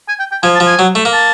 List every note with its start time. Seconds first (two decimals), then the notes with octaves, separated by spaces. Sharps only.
0.08 G#5
0.20 G5
0.32 G5
0.43 F3 G#5
0.55 A5
0.60 F3
0.67 G#5
0.79 F#3
0.95 A3
1.05 A#3
1.13 A5